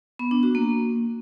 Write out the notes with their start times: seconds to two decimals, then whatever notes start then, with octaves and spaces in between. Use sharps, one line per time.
0.19 B3
0.31 D4
0.43 F#4
0.55 A#3